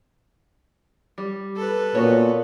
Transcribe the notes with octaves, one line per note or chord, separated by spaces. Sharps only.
G3
A4 B4
A#2 B3 F#4 C#5